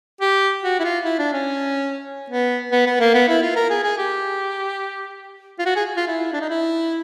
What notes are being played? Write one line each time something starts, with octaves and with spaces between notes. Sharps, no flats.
G4
F#4
E4
F4
E4
D4
C#4
B3
B3
B3
A#3
B3
E4
F4
A#4
G#4
G#4
G4
F4
F#4
G#4
F4
E4
D4
D#4
E4